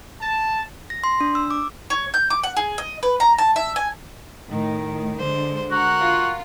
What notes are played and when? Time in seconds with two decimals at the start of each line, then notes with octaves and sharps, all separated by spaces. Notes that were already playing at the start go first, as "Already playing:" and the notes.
0.22 A5
0.90 A#6
1.04 C6
1.21 D4
1.35 E6
1.51 D6
1.90 C#5
2.14 G6
2.30 D6
2.43 F#5
2.57 G#4
2.78 D#5
3.03 B4
3.20 A#5
3.38 A5
3.56 E5
3.76 G#5
4.47 A2 D#3
5.19 D3 G#3 C5
5.71 F#4 A#4 F#5
6.01 F4